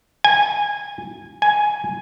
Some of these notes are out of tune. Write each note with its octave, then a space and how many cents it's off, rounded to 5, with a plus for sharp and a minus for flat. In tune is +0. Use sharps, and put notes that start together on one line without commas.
G#5 -15
G#5 +5